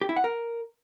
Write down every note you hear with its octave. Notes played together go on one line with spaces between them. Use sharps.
G4
E4
F#5
A#4